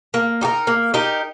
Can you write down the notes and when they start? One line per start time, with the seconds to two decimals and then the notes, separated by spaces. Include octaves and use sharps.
0.14 A#3
0.41 D#4 G4 A#4
0.67 A#3
0.94 D#4 G4 A#4